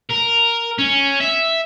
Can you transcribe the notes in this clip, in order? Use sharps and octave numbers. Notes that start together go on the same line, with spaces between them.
A#4
C#4
E5